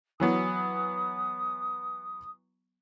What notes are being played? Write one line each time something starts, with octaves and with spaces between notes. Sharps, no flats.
E3 F#3 B3 D#6